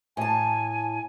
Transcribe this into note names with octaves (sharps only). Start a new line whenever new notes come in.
A2 G#5 A5